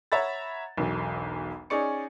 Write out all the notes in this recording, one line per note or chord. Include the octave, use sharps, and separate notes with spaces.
C#5 E5 F#5 A#5 B5 A6
E1 B1
C#4 D#4 G#4 D5 C#6 C#7